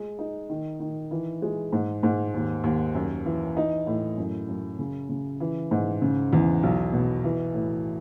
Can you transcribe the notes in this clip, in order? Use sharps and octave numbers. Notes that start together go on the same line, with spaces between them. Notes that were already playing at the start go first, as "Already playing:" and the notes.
Already playing: G#3
D#4
D#3
D#3
E3
G#3
G#2
G#2
D#2
D#2
F#2
E3
D#4
A2
F#2
F#2
C#3
C#3
E3
G#2
C#3
E2
B1
B2
E3
A2